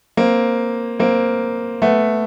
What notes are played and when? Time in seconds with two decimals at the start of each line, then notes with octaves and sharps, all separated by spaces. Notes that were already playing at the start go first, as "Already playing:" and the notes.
0.17 A#3 C4
0.99 A#3 C4
1.82 A3 B3